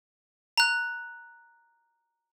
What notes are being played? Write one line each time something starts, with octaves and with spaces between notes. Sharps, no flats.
A#5 F#6